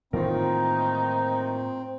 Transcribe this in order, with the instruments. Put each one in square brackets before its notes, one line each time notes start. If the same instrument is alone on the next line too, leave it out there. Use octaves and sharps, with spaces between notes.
[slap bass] A2 E3 A#3 [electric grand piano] D#3 F4 A#4 [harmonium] C4 [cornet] D#4